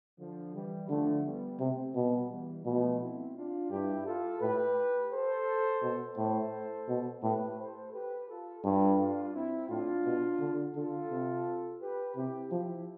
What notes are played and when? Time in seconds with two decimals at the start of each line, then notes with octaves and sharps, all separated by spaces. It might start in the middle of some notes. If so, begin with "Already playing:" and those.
0.19 D3 F3
0.54 E3 G3
0.89 D3 F3 A3
1.25 G3 B3
1.60 C3 A3 C4
1.95 B2 G3 B3
2.31 E3 G3
2.65 B2 F3 A3
3.01 C4 E4
3.36 D4 F4
3.71 G2 E4 G4
4.06 F4 A4
4.41 A2 G4 B4
5.12 A4 C5
5.82 B2
6.18 A2 A4 C5
6.88 B2
7.23 A2 G4 B4
7.59 A4 C5
7.93 G4 B4
8.29 F4 A4
8.64 G2 F4 A4
8.99 D4 F4
9.34 C4 E4
9.69 A2 D4 F4
10.05 B2
10.41 D3
10.75 D3 F4 A4
11.11 C3
11.81 G4 B4
12.16 C3 E4 G4
12.52 F3 E4 G4